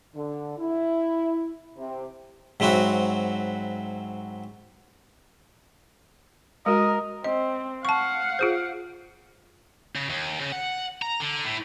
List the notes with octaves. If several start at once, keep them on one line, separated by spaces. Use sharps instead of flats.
D3
E4
C3
G#2 F#3 C4 E4 F#4
G#3 F#4 A#4 D#5
C4 D#5
F5 F#5 A5 C#6
F4 G#4 C5
C#3
D#2
C#3
F#5
A#5
D3
A2